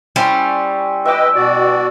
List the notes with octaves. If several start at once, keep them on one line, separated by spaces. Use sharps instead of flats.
G3 C#4 E4 C5
B4 D#5 E5 G5 D6
B2 F#4 D5